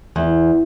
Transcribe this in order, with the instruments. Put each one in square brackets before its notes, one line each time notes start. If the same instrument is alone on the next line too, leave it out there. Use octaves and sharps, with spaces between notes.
[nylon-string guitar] E2